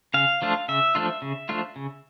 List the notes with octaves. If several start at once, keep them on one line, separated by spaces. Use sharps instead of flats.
C#3 F5
F3 A3 D4 F4
C#3 E5
F3 A3 D4 F4
C#3
F3 A3 D4 F4
C#3